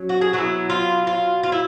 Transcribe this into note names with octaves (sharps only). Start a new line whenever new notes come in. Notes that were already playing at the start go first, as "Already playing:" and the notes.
Already playing: F#3 C#4
F#4
G#4
F#3 B3 E4 F#4
F4
F4
F4
E4